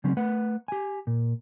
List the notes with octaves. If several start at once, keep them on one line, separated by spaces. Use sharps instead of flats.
C#3 F#3 C4 C#4
A3 B4 F#5
G4 G#5
A#2